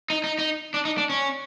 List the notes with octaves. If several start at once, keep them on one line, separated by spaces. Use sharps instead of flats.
D#4
D#4
D#4
D4
D#4
D4
C#4